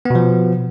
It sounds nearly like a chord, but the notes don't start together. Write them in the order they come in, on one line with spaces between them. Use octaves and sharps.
B3 B2 F3